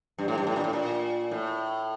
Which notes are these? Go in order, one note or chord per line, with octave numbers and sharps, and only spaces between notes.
G2
A2
G2
A2
A#2
A2
A#2
A2